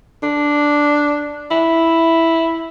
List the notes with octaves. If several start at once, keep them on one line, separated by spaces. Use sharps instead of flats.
D4
E4